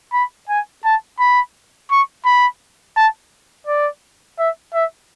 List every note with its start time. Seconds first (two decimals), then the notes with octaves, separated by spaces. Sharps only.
0.13 B5
0.49 G#5
0.85 A5
1.19 B5
1.91 C#6
2.25 B5
2.97 A5
3.67 D5
4.39 E5
4.74 E5